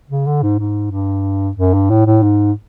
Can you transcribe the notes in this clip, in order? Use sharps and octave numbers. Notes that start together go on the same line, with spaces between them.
C#3
D3
G#2
G#2
G2
F#2
G2
A2
A2
G#2